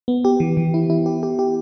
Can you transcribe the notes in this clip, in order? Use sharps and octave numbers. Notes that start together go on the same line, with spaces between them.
B3
G4
E3
E3
E4
E4
G4
G4
G4